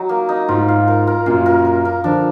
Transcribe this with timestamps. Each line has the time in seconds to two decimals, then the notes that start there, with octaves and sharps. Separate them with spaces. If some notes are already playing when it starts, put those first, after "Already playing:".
Already playing: F#3 D#4
0.09 A#3
0.29 D#4
0.48 G#2 F4
0.68 F5
0.88 A#4
1.07 A#4
1.26 F#2 A#2 F5
1.46 A#4
1.65 A#4
1.85 A#4
2.04 D3 F3 D4